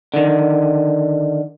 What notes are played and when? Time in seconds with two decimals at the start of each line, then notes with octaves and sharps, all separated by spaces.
0.14 D3 D#3